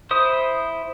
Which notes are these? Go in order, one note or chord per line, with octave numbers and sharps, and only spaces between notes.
E4 C5 D#6